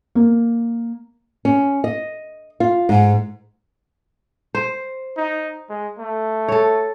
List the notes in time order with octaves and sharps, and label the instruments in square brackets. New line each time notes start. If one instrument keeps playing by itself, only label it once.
[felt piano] A#3
[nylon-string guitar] C#4
D#5
F4
G#2
[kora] C5
[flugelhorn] D#4
G#3
A3
[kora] A4 C#5